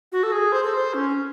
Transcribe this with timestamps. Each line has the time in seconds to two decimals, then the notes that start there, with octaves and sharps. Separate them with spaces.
0.12 F#4
0.23 A4
0.32 G#4
0.52 C5
0.63 A4
0.74 C5
0.94 C#4